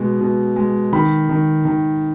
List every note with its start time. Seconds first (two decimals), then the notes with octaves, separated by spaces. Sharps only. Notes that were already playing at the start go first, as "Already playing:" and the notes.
Already playing: B2 G#3
0.21 B2
0.56 G#3
0.93 D#3 B5
1.29 D#3
1.65 D#3